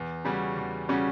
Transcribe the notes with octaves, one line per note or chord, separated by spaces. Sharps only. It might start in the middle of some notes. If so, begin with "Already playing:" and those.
Already playing: E2
C#3 G3 C#4 F#4
E2
C#3 G3 C#4 F#4